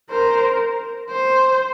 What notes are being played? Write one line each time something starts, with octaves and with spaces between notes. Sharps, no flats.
A#4 C5
C5